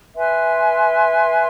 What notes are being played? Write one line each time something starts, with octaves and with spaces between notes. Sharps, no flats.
B4 E5 G#5 C6